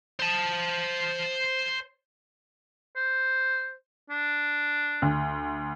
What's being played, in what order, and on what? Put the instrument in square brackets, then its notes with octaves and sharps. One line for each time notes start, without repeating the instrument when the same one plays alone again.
[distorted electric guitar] C5 A5
[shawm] C5
D4
[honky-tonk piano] D2